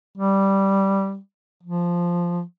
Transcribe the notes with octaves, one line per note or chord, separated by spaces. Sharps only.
G3
F3